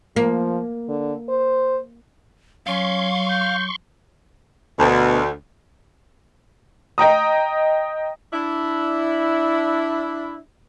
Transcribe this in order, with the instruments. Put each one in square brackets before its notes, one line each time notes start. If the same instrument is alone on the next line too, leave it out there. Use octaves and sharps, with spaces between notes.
[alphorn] F3 [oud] A#3
[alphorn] D3
C5
[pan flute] F#3 [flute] C#4 [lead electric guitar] F5 [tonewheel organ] C6 C#6
[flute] G6
[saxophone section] D2 [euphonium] B2
[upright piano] D#5 G5 A#5 D#6
[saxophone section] D4 E4